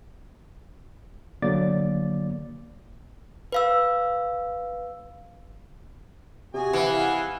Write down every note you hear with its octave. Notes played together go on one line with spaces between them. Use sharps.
D3 F#3 A#3 D5 D6 A6
B4 F5 E6
C3 F#4 G#4 G#5
E3 E4 F5 F#5